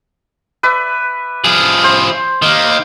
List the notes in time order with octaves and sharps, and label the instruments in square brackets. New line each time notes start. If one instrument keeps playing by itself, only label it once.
[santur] B4 D5 E5
[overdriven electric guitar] F3 G#4
[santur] C5
[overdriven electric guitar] D#3 A#3